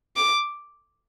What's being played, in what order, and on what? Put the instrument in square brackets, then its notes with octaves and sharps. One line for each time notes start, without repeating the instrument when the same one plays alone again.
[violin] D6